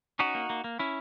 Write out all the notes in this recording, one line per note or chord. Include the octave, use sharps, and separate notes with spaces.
C#4 D#4 F#4
A#3
A#3
A#3
C#4 E4